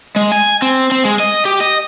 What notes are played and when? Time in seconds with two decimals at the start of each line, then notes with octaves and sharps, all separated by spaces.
0.16 G#3
0.32 G#5
0.62 C4
0.91 C4
1.05 G#3
1.20 D#5
1.45 G4
1.61 D#5